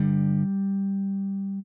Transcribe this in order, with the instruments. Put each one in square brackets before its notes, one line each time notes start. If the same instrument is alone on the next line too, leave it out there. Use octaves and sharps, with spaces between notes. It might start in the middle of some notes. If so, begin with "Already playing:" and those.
Already playing: [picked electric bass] G2 D3 G3